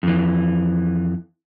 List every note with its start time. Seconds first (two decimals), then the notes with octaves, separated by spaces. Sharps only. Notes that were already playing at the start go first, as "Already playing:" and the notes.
0.03 F2 E3